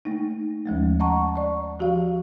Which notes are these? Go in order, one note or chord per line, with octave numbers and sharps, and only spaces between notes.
A3 A#3 D#4
D#2 F3 G#3 A3
D#5 F#5 A5 A#5 C#6
D5 C#6
F3 F#4 G4 F5